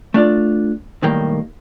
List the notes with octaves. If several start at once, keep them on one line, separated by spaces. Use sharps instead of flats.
A3 D4 F4 D5
B1 A2 D#3 G3 A#3 G5